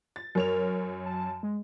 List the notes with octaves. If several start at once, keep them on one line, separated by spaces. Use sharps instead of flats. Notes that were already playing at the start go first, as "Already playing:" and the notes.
A6
F#2 A#4 C#5 F7
A5
G#3